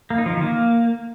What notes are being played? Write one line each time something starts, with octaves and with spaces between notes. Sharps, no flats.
A#3
D#4
F3
D#3
A#3